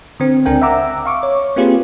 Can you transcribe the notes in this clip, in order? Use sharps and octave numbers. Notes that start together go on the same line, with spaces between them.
D3 C4
C#2 C4 D4 A#4 G5 G#5
E5 F#5 A#5 D6 E6
F5 C#6 D6
C#5
A#3 C4 F4 G4 G#4 B4